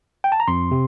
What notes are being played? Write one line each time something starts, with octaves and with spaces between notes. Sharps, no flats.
G5
A5
A#5
F2 C6
C3